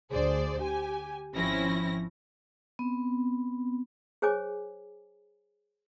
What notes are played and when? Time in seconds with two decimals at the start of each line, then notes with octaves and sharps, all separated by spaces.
0.11 D2 G#4 C5 D5
0.61 G4 G#5
1.34 G#1 F3 C4 C#4 E4 A#6
2.79 B3 C4
4.22 G#4 C5 C#5 G#5 D6